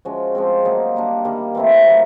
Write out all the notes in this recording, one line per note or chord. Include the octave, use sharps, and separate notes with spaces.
F3 G#3 C#4 F#4
F3 G#3 C4
F#3 A#3 D#4
G3 A#3 D4
D#3 G3 A#3
E3 A3 C4 E4
D#3 F#3 A#3